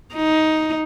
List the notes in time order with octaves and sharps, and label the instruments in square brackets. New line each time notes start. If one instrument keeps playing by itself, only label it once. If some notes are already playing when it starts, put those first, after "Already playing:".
[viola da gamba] D#4